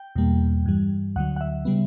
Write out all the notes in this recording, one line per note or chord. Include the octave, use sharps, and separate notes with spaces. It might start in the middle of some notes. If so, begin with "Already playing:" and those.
Already playing: G5
E2 B2 G3 A#3
G2 E3 G3
D2 D3 F#3 F#5
F#5
E5
C#3 G3 B3